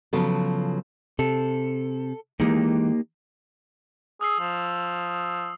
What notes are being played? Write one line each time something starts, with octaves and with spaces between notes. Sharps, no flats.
C#3 F3 F#3 B3 F4 A4
C3 A4
E3 G#3 A#3 D#4 G4
G#4 D#6 E6 C7
F3